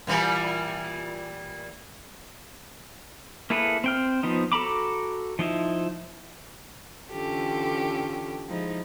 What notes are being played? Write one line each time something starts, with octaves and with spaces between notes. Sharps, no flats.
A#2 E3 G3
A#3 E4 G#4 A4 B4
C4 G5 F6
F3 B3 D#4
F#4 A4 A#5 B5 D6
F3 D#4 E4
D3 E3 C#4 F4 G4 A4
F3 G#3 D#4 E4